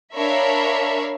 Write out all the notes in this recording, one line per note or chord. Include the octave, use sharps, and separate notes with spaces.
D4 A#4 C#5 E5 F5 B5